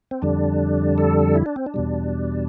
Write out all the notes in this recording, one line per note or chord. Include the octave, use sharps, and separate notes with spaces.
C4
F2 D3 G3 D4
A4
E4
D4
C4
D4
E2 B2 G3